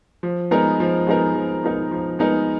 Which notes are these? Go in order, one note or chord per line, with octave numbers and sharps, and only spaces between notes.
F3
G#3 B3 D#4 A#4
F3
G#3 B3 D#4 A#4
F3
G#3 B3 D#4 A#4
F3
G#3 B3 D#4 A#4